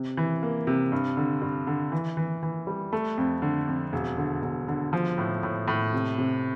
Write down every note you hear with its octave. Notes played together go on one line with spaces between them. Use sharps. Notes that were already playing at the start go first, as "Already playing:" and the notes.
Already playing: C3
E3
A#3
C3
G2
D3
G2
D3
E3
E3
E3
G3
A3
F2
D3
F2
E1
D3
E1
D3
F3
A2
A2
A2
C3
C3